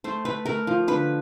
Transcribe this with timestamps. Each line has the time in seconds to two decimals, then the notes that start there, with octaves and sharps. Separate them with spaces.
0.04 A3 C5
0.25 A3 B4
0.46 A3 A#4
0.67 F3
0.88 D3 B4